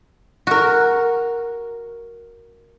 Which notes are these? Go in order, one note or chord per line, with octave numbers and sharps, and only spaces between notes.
F#4 A#4